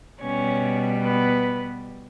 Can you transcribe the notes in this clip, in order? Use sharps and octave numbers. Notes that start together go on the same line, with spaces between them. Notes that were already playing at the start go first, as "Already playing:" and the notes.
B2 G3 B3 C#4 C#5
B3 B4